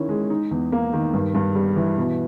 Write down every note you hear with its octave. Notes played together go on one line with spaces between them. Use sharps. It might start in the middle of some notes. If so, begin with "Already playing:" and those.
Already playing: D#3 C#4 E4
G#3
D#4
E2
A#3
D#3
G2
G2
G3
E3
B2